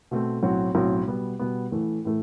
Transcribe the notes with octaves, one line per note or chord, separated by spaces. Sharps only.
B2 A3 C4
B1 A2 F#3 C4 F#4
B1 A2 F#3 C4 F#4
B2 G3 B3
B2 G3 B3
A1 A2 E3 A3
A2 E3 A3